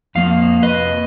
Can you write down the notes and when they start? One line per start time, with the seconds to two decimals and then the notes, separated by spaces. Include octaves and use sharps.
0.15 F2 F3 A#3 F5
0.63 B4 D#5